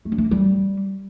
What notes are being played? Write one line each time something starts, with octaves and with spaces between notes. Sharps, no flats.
A3
D4
A3
A#3
G3